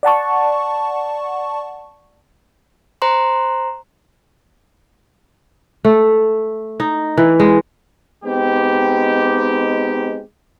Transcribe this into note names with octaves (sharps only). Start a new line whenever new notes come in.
D5 F#5 A5 C#6
C5 A#5 C6
A3
D#4
E3
G#3
G#3 B3 C4 D#4 G4